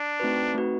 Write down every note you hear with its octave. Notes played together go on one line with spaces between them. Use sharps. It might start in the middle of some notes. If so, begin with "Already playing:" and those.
Already playing: D4
A3 C4 D#4 F#4 B4
A3 C4 D#4 F#4 B4